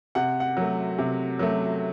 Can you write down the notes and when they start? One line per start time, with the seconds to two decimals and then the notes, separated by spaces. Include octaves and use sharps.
0.15 C3 F#5
0.40 F#5
0.57 F#3 A3
0.98 C3
1.39 F#3 A3